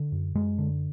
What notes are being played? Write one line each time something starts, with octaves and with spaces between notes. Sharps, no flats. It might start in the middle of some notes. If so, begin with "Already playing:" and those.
Already playing: D3
F#2
F#2 G#3
D3